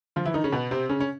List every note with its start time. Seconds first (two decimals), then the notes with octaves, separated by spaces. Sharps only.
0.16 F3 F4
0.26 E3 E4
0.34 D#3 D#4
0.44 C#3 C#4
0.53 B2 B3
0.71 C3 C4
0.89 C#3 C#4
1.00 C#4